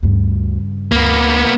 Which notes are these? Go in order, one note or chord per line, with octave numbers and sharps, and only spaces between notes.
D2 G2 C#3
D2 A#3 B3